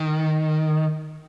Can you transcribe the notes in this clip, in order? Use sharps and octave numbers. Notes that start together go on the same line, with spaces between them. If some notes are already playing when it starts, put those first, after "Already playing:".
Already playing: D#3